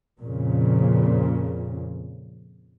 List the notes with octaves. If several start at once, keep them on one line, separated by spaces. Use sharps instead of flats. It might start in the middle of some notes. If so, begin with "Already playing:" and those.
F2 A#2 C#3